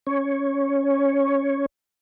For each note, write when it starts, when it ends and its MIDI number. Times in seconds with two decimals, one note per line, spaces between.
0.07 1.66 61
0.07 1.66 73